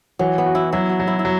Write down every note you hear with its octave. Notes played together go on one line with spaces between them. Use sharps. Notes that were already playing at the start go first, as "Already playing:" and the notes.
E3 F#3
B3
F#4
E4
F#3 E4
F#4
F#3
E4
E4
F#3